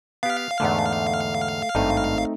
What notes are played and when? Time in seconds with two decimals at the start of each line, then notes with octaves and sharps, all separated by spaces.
0.23 B3 G4 F5
0.60 E2 G#2 D3 A3
1.75 G#1 G2 A3 C4 D#4